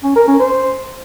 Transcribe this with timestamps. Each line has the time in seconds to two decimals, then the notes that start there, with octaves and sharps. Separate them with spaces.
0.04 C#4
0.16 A#4
0.28 C#4
0.40 C5